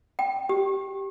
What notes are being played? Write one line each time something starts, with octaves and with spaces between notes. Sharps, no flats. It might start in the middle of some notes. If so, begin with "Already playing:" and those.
G5
G4